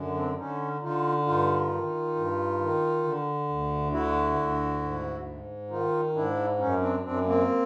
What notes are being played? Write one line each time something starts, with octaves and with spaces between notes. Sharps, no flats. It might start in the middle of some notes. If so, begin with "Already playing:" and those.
Already playing: F#2 D3
C4 D4
D3 C#4 D#4
D3 D#4 F4
G2 D#4 F4
D#3
G2
D#3
D3
D2
D3 E4 F#4
D2
G#2
G#2
D#3 D#4 F4
G#2 D4 E4
F#2 C#4 D#4
C4 D4
F#2 C4 D4
A#3 C4